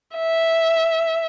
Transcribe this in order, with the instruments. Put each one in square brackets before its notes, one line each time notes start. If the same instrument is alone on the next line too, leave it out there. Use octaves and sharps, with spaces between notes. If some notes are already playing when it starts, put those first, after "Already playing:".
[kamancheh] E5